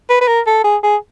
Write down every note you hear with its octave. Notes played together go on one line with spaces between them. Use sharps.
B4
B4
A#4
A4
G#4
G#4